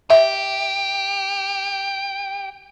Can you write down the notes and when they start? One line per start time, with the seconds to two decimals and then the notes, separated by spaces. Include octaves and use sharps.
0.10 G4 E5